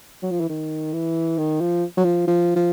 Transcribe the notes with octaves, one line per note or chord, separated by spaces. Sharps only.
F#3
F3
E3
D#3
E3
D#3
F3
F#3
F3
F3
F3